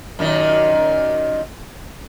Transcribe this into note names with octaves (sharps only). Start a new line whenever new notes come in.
F#2 A#2 D#3